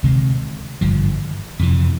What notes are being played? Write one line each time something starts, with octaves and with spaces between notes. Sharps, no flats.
D2 C3 D#3 G#3
G#1 G2 D3 F3
F2 C3 E3